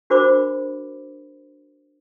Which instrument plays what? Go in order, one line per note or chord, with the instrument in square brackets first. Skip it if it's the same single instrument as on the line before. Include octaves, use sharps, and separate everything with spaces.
[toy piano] D4 F#4 A#4 C5 B5 D6